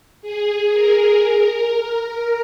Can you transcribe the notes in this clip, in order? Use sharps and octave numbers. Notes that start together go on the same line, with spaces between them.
G#4
A#4
A#4
A#4